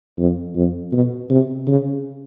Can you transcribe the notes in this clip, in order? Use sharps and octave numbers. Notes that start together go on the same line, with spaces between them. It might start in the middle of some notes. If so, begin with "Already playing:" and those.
F2
F2
B2
C3
C#3